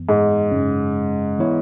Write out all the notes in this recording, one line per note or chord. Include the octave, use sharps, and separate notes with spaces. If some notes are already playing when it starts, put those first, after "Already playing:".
Already playing: F#2 E3 B3
G#2
F#2 C#3 G#3 C#4
E3 B3 E4 C#5